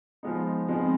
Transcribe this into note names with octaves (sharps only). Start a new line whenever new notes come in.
F3 G#3 B3 D#4
F3 G#3 B3 C4 D#4